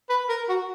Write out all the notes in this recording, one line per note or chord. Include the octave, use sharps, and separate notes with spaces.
B4
A#4
F#4